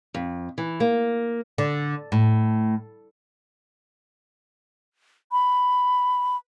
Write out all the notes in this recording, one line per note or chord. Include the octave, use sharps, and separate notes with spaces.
F2
E3
A#3
D3
A2
B5